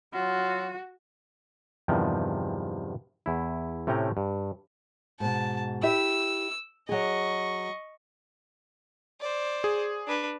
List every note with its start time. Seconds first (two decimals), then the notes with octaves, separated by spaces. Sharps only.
0.14 F#3 F4 F#4
1.88 E2 G2 C3 D#3 F3
3.26 E2 E4
3.87 A2 C3 A3 C#4 G5 A#5
4.17 G2
5.20 G#2 B2 A5
5.83 E4 G4 E5 E6
6.89 F#3 G#4 D#5 C#6
9.20 C5 D5
9.64 G#4
10.07 D4 B4